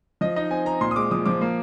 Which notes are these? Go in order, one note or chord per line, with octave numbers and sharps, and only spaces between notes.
F3 D#5
D#4 D#5
C4 G#5
C4 A#5
A#2 C6
D#6
G#3 D6
F3 D#6
F3 D6
A#3